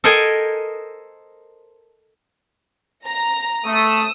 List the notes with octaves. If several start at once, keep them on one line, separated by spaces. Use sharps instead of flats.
A4 A#4 C5 D#5 G5 G#5
A#5
A3 D#6 E6